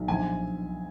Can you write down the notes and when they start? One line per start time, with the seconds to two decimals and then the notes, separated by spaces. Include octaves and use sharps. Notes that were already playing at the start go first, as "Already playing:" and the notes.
Already playing: B1
0.08 A#1 G#5